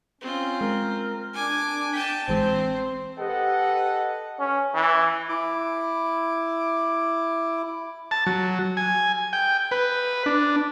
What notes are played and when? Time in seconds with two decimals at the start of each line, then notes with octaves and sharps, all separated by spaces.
0.21 C4 C#4 F4
0.61 G#3 A#4
1.34 D4 G#5 D6
1.93 G5 A5 B6 D#7
2.28 A1 E3 G#3 C4 C5
3.18 G4 A4 B4 D#5 F#5
4.40 C#4
4.74 E3
5.29 E4 D6
8.11 A5
8.27 F#3
8.77 G#5
9.33 G5
9.71 B4
10.26 D4